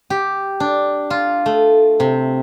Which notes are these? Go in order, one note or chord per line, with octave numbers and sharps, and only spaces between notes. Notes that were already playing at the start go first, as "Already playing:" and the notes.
G4
D4
F4
A3
C3